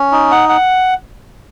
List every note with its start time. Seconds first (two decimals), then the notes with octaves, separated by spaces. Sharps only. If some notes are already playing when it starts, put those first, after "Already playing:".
Already playing: C#4
0.12 D#4
0.31 F#5
0.49 F#5